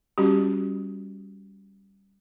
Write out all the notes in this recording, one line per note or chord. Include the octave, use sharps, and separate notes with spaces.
G3 C#4 F#4 G4